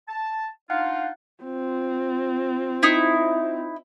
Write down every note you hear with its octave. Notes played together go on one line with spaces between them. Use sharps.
A5
D4 D#4 F4 F5 F#5 F#6
C4 F4
D#4 E4